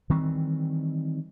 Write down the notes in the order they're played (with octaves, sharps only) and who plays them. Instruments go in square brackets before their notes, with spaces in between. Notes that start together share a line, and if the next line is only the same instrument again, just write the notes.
[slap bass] D#3 E3 G3 C4